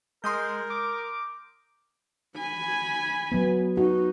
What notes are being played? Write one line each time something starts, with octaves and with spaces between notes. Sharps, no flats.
G#3 A#4 C6 D#6 G6
D6
G#5 B5
F#3 B3
D#4 F#4